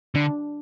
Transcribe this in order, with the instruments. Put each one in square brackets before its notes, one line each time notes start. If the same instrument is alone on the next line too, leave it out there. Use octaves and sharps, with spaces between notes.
[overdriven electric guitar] D3 [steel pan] D4